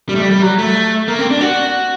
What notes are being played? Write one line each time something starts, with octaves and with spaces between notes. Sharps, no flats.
G3
A3
G3
G3
F#3
A3
A#3
C4
D4
F#4